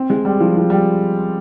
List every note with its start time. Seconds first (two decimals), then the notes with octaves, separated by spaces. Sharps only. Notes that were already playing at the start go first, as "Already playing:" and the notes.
Already playing: C4
0.10 G#3
0.25 G3
0.40 F3
0.56 F3
0.70 G3